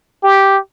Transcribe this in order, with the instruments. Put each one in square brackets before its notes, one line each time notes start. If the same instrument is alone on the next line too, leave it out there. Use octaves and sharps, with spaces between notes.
[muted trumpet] G4